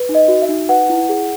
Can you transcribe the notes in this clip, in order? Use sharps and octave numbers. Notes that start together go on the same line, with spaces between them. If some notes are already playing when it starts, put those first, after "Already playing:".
Already playing: B4
D#4
D#5
F#4
E5
D#4
B4 F#5
E4
G#4